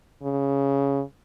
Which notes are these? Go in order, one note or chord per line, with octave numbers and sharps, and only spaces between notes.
C#3